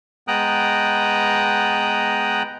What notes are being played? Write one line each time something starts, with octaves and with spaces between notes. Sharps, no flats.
G#3 B3 G5 A#5 D#6 F#6